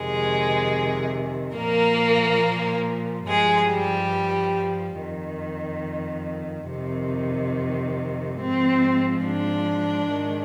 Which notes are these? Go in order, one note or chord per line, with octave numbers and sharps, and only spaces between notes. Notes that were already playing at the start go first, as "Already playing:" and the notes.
Already playing: F2 C3 D#3 G#3 G#4
A#2 F3 A#3 A#4
G2 F3 G#3 G#4
G3 G4
F2 D#3
F2 C3 D#3
G#2 F3 C4
D4
G#2 D#3